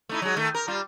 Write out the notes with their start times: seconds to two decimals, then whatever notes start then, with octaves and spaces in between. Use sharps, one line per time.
0.09 A3 D#4 E4
0.22 F#3 G#3
0.37 D#3 A3
0.55 A#4
0.68 G3 F4